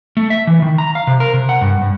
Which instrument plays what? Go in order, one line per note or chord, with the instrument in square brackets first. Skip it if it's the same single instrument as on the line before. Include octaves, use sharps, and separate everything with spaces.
[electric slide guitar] A3
E5
E3
D#3
A#5
F5
C3
A#4
C3
F#5
G2
G2